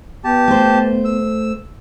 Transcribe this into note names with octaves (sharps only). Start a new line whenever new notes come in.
B3 G4 A5
A3 C5
E6